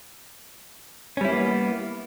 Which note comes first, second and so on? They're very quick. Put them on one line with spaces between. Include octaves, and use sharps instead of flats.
C#4 G3 E4 A#3 B3